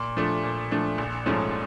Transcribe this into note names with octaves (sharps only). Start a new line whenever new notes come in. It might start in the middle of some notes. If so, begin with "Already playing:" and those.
Already playing: A#2
F3 A3 D4
A#2
F3 A3 D4
A#1
G#2 F3 A3 C#4